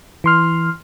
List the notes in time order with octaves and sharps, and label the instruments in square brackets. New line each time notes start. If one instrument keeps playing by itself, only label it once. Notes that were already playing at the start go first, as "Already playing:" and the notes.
[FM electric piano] E3 C6 F6